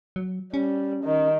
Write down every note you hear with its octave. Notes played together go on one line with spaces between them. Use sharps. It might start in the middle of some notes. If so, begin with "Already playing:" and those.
F#3
G3 C#4
D#3